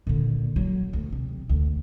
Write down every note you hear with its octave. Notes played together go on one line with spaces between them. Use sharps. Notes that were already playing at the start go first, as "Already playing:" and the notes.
A#2 D3
F#3
D2
C3
D2